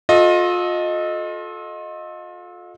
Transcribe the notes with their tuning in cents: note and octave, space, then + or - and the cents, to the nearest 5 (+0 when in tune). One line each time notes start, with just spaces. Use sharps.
F4 +30 A4 -20 D#5 +0